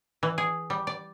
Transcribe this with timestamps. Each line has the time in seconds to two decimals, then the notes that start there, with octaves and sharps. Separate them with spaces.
0.23 E3
0.38 G#4
0.70 G3
0.87 D5